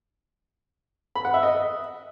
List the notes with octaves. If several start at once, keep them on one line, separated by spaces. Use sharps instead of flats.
B5
F#5
E5
D#5